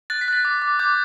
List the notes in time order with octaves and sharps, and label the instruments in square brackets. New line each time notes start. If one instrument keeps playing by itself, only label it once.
[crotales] F#6 A6
B6
F#6 A6
D6
D6
D6 G6